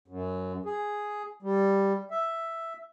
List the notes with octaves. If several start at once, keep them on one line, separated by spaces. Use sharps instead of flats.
F#2
G#4
G3
E5